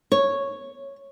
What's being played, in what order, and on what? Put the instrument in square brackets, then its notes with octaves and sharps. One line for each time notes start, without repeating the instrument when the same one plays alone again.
[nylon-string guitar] C#5